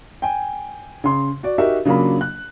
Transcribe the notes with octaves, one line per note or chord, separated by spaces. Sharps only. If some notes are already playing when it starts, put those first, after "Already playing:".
G5 G#5
C#3 C6
F#4 D5
D#4 F#4 G4 A#4 E5
C#3 F#3 A#3 D4 F4 B5
F#6